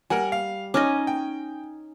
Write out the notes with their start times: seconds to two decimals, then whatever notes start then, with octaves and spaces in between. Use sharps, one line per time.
0.10 G3 A#4 F#5 G#5
0.32 F5
0.74 C#4 D#4 D#5 D6 F6
1.07 G5